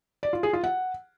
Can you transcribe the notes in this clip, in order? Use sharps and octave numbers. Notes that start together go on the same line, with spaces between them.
D5
F4
G#4
F4
F#5